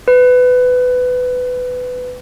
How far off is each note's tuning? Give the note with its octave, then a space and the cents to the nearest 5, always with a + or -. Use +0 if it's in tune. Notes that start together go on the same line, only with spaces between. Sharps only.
B4 +20